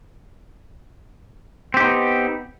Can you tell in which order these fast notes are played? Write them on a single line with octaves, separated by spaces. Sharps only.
C4 G4 D#4 B3